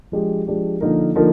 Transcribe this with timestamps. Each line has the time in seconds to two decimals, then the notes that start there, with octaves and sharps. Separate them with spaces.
0.12 F3 G#3 D4 G4
0.47 F3 G#3 D4 G4
0.81 D3 F3 A#3 D#4 A#4
1.15 D3 F3 A#3 D#4 A#4